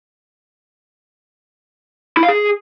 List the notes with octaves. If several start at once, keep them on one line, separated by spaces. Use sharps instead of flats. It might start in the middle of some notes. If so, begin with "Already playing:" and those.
E4
F5
G#4